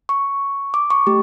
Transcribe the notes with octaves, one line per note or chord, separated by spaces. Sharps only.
C#6
D6
C#6
A3 G4